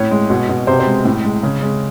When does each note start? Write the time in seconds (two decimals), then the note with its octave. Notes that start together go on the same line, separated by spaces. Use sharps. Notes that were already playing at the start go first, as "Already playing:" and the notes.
Already playing: A2 C#5
0.11 G#3
0.30 B2
0.49 B2
0.67 C3 C5
0.80 C5
0.87 G#3
1.05 A2
1.24 G#3
1.43 C#3
1.62 G#3